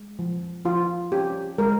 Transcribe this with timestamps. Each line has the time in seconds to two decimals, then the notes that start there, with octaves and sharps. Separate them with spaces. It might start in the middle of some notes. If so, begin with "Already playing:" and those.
Already playing: G#3
0.19 F3
0.65 F3 F4
1.12 C#4 G4
1.58 G#3 A#4